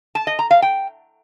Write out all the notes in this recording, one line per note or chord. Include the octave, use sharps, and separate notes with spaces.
A5
D#5
A#5
F5
G5